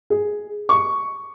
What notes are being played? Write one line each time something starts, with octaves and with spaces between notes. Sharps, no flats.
G#4
C#6